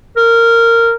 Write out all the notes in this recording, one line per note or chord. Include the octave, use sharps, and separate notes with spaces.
A#4